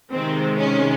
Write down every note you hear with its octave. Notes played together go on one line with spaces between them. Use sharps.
C3 D#3 G#3 C4
C#4